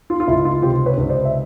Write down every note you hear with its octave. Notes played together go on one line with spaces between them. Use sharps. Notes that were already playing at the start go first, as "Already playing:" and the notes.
F4
F4
C#2 E4
F4
C3 F4 G4
B4 C#5
C#2
C5 D5
E5